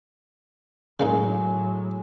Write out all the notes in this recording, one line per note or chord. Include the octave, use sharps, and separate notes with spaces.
A2 C#3 F#3 G#3 A#3 D#4